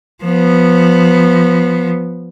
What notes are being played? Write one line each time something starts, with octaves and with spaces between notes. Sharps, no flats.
F3 B3